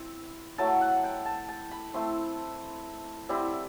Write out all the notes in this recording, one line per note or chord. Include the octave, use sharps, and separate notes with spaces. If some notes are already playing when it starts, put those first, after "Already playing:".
Already playing: C4 E4
F#3 A3 E4 A5
F#5
G5
A5
A5
B5
A3 C4 E4 C6
G3 C4 E4